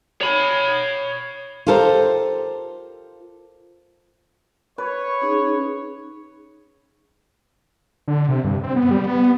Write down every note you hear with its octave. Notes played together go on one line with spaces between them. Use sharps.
C#5 B5
F4 G4 A4 A#4 C5
B4 C#5
C#4 D#4 G#4
D3
C3
G2
C4
B3
G3
B3